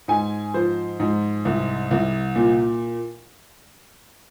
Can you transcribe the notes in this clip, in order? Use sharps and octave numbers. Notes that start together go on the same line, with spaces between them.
G#2 G#5
F3 C5
G#2
C2
C2
A#2